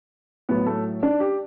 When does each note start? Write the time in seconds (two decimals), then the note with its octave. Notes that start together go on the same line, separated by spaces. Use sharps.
0.49 A2 F#3 B3 B4
0.66 A3 A4
1.03 D4 D5
1.20 G4